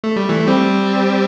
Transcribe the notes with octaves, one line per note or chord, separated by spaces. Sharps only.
A3
G3
E3 A3
A3
G3 C4